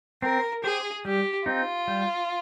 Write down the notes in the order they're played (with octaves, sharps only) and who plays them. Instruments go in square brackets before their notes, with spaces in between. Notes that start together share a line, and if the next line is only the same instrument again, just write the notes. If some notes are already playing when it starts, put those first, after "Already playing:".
[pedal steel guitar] C4 [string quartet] A#4
[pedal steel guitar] G4 C5 [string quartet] G#4
[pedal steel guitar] G3 [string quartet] G4
[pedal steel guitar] C4 D#4 [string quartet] F4
[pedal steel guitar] G3